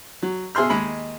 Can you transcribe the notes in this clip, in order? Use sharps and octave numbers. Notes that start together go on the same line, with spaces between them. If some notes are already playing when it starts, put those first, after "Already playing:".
F#3
B2 G#4 E5 C6 F6
D#2 G#3 B5